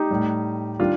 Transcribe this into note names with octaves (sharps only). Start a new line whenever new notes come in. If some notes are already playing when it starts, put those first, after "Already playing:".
Already playing: D#4 G4
A2 G3
D#3 G3 D4 F4